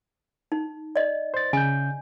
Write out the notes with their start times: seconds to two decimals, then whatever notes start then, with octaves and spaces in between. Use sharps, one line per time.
0.52 D#4
0.96 D5 D#5
1.34 C5 A6
1.53 C#3 G#5 G6